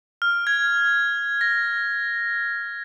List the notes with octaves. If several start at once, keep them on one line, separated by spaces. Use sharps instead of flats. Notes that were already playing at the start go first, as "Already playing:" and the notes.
F6
G#6
A#6